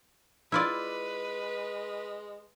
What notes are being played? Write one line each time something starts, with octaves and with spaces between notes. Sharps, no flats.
G#3 E4 F4 B4 D5